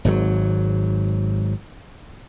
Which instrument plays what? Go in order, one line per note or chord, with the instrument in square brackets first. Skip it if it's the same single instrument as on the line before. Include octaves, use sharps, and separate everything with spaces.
[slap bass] G#1 G#2 C3 F#3